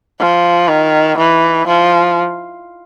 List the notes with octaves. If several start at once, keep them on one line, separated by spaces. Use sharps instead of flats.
F3
D#3
E3
F3